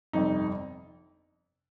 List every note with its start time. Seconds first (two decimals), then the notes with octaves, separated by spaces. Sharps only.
0.13 G1 F2 C3 D#4